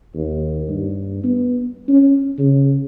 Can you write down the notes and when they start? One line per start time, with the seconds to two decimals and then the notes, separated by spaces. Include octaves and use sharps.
0.15 D#2
0.69 G2
1.24 B3
1.88 C#4
2.38 C#3